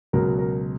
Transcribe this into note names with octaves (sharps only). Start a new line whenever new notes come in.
C#2 B2 F#3 A#4
A#4